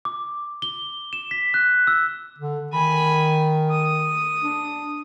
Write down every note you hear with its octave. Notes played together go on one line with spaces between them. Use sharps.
D6
G7
E7
B6
F#6
E6
D3
D#3 G#5 B5
D#6
D4